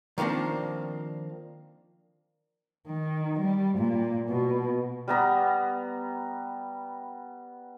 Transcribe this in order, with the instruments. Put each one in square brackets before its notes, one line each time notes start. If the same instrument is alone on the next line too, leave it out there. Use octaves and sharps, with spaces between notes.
[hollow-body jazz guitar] D#3 F3 A#3 C4 D4
[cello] D#3
G3
A#2
B2
[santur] G3 B3 A#5